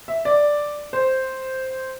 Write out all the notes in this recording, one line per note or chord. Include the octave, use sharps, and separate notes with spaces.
E5
D5
C5